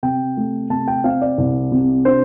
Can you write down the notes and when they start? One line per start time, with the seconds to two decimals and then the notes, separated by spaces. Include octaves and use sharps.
0.03 C3 G5
0.37 A3
0.70 C3 A5
0.88 G5
1.04 C4 F5
1.21 D5
1.38 C2
1.72 C3
2.05 D4 C5